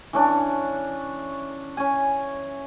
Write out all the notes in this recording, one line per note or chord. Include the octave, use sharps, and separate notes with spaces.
E3 C#4 D4
C#4 G#5